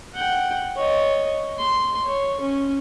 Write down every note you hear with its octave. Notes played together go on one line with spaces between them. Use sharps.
F#5 G5
C#5 D#5
C6
C#5
C#4